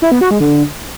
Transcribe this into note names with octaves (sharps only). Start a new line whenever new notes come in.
E4
B3
F#4
G#3
D3